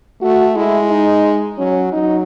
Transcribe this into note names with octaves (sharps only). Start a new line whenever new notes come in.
A3 F#4
G#3 E4
D#4
F#3 C#4
F#3 D#4